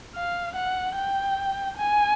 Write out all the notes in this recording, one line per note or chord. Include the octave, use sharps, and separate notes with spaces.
F5
F#5
G5
G#5